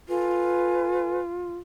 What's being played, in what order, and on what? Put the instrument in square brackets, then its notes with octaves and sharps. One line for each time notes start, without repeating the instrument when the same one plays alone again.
[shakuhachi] F4 [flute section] A4 B4 G#5